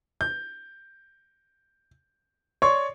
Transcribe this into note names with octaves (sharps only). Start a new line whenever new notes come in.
G6
C#5 D5 C6 C#6